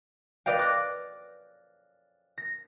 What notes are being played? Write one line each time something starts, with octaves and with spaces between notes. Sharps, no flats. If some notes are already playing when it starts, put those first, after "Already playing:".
B4 D5 D#5 F5 G5
D6 F#6 A#6
A#6